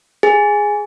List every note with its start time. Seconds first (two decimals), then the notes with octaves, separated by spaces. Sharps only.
0.23 G#4